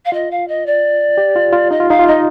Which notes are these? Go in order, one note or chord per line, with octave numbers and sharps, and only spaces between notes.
F5
F4 D#5
F5
D#5
D5
G4
F4
F4
D#4 D#5
F4
D#4 F5
F4
D#4 D#5